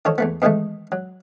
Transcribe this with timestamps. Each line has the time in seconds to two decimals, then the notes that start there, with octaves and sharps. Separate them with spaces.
0.05 D#3 F3 A4 C#5
0.18 E2 A3 B3
0.42 B2 D#3 E3 G#3 A3
0.92 F#3